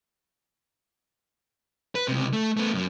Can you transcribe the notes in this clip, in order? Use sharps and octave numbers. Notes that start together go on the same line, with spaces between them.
B4
C#2 C3
A3
A3 B3
F#2 F#3